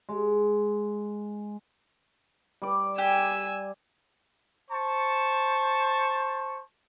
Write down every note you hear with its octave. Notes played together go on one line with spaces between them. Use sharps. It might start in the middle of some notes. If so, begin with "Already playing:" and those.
G#3
G3 D5
G4 G#5 E6
C5 A5 C#6